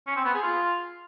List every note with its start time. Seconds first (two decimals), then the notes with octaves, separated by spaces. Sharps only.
0.07 C#4
0.16 C4
0.25 B3
0.34 G#4
0.43 F4